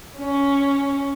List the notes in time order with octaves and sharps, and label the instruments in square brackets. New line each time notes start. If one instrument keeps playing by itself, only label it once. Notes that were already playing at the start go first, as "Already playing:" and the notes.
[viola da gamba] C#4